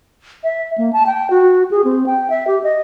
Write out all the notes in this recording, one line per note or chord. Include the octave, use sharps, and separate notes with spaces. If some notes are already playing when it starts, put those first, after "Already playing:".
E5
A#3
A5
G5
F#4
G#4
C4
G5
E5
G4
D#5